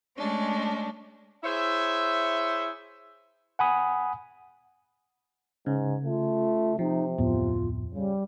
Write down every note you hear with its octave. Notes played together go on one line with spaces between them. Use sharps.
G#3 A3 C#4 D4
E4 G#4 C5 C#5 E5
F#5 G#5 B5 D#6
G#2 C#3
A3 F4
C3 F3 D#4
D1 F2 A2 B3 F4
C#3 G3